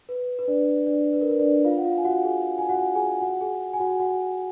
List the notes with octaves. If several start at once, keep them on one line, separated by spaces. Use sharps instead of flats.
B4
B4
D4 D5
D4 D5
B4
A#4
B4
D4 D5
F4 F5
F#5
F4 F5
G#5
F#4 F#5
G#4 G#5
G#5
F#4 F#5
G#4 G#5
F#4 F#5
G#4 G#5
G#5
F#4 F#5
F#4 F#5